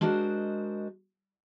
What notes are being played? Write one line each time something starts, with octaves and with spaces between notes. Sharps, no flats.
G#3 D4 F#4 A#4 C5 D#5